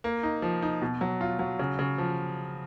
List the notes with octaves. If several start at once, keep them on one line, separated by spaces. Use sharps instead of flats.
A#3
D#4
F3
D#4
B2
F#3
F4
F#3
C#3
C#3
F3